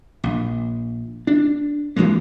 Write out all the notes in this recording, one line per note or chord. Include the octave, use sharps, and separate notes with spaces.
A#1
D4
E3 F#3 G#3 A#3